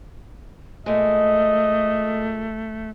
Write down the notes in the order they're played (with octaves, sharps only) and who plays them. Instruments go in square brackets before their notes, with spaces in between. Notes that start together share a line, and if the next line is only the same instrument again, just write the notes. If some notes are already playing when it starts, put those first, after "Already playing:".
[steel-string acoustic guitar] A#2 G#3 [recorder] A3 [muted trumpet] D#5